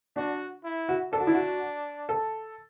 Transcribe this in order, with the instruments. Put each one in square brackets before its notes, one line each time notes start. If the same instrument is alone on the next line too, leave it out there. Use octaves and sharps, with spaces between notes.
[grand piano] D4 [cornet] F#4
[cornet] E4
[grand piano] F#4
[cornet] D4 [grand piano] A4
[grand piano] F#4
E4
F#4
A4